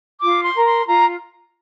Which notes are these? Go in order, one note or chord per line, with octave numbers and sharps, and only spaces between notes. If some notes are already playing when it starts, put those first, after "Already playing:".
F4 D6
C6
A#4
C6
F4 A#5